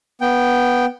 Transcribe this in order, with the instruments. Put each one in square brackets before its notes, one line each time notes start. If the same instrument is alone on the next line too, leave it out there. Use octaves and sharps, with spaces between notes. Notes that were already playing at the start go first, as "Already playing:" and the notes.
[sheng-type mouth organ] B3 G5